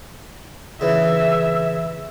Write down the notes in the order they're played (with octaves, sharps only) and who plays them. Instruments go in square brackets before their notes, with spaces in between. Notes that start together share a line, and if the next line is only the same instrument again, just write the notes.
[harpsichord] C#3 E3 [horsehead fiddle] E5